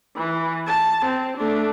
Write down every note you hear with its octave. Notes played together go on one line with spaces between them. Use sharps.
E3
A5
C4
A3 D4